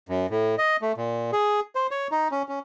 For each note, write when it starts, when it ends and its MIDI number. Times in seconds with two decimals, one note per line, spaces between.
0.09 0.26 42
0.30 0.55 45
0.58 0.77 75
0.82 0.92 57
0.97 1.31 46
1.32 1.60 68
1.75 1.87 72
1.91 2.07 73
2.12 2.28 63
2.32 2.42 61
2.49 2.59 61